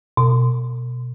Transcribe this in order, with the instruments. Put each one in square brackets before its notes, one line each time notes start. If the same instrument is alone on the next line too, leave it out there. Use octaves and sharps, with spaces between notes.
[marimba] B2